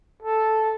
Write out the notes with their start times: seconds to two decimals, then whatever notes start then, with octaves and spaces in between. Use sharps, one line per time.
0.22 A4